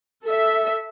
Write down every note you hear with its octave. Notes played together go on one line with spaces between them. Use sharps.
A4 E5